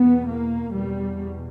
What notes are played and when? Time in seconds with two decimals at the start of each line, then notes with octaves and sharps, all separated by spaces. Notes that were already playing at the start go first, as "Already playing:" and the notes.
Already playing: E2 B2 B3
0.26 A#3
0.72 E2 B2 G3